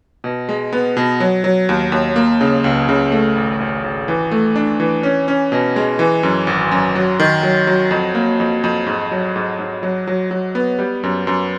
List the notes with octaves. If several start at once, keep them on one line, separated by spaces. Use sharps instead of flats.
B2
G#3
B3
B2
F#3
F#3
D#2
D#2
A#3
C#3
C#2
C#3
A3
G#1
G#1
G#1
E3
A3
D4
E3
C#4
C#4
B2
G#3
E3
F#2
G#1
F#2
F#3
D#3
F#3
F#3
F2
A#3
F2
F2
G#2
F#3
G#2
G#2
F#3
F#3
F#3
B3
G3
F#2
F#2